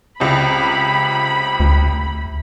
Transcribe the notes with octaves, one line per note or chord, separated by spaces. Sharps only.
C#2 C3 B5
D2